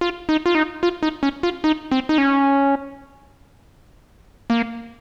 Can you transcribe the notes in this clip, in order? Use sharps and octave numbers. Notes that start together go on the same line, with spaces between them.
F4
D#4
F4
D#4
F4
D#4
C#4
F4
D#4
C4
D#4
C#4
A#3